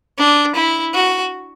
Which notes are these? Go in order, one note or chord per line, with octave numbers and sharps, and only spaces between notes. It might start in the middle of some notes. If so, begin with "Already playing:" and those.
D4
E4
F#4